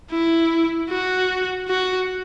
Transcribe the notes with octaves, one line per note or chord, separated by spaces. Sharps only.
E4
F#4
F#4